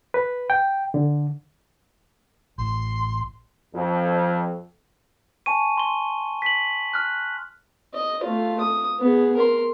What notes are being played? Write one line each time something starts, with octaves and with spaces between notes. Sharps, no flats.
B4
G5
D3
A1 C6
F2
G#5 A5 C#6 D#7
C6 G7
B6 F#7
F6 F#6
D#5
A3 F4
D#6
B3 G#4
A#4 C6